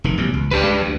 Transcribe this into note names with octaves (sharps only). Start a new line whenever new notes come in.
F1 D#3
A1 B2 G3
C#2
C#2 D4 G4 B4
G#3
D2